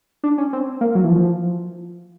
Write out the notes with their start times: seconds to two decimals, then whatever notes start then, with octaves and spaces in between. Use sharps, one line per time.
0.24 D4
0.38 C#4
0.53 C4
0.81 A#3
0.95 F#3
1.04 E3
1.10 F3